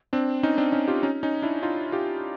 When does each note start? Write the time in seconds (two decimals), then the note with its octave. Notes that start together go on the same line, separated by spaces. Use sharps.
0.13 C4 D4
0.43 C#4 D#4
0.58 C4 D4
0.72 C#4 D#4
0.87 F4 G4
1.03 C#4 D#4
1.23 C#4 D#4
1.42 D4 E4
1.63 D#4 F4
1.92 F4 G4